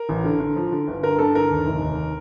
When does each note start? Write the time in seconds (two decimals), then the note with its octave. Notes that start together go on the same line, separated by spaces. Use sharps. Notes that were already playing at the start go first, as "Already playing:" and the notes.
Already playing: A#4
0.09 A1
0.24 D3
0.40 D3
0.56 F3
0.72 D3
0.87 G1
1.03 D3 A#4
1.19 G2 A4
1.35 D3 A#4
1.51 D#2
1.66 F1
1.82 D#2